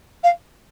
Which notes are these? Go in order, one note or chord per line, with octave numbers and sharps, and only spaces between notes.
F5